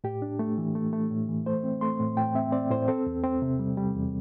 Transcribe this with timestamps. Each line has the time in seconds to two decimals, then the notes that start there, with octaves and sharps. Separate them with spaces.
0.04 A2 G4
0.22 D4
0.39 A3
0.58 E3
0.75 A3
0.93 A3
1.11 A2
1.28 E3
1.46 A3 C5
1.64 C4
1.81 A3 C6
2.00 A2
2.17 A2 G5
2.35 C4 E5
2.52 C4 D5
2.70 A2 C5
2.88 C4 A4
3.07 E2
3.23 C4
3.42 C3
3.59 G3
3.77 G3
3.95 E2